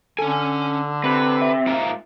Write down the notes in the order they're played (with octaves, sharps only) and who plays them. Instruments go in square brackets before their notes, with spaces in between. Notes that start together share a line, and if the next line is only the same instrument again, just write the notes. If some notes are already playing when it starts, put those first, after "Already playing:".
[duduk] D3 [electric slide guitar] C#4 G#5 [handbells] A4
[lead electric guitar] C3 [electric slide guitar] B4
[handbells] E5
[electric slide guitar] G#2 F4 A#4